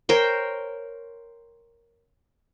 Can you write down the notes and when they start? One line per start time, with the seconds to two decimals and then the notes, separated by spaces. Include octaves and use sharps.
0.09 A#4 C5 C#5 G5